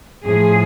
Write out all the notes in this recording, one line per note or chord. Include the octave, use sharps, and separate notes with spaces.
A2 F3 G#4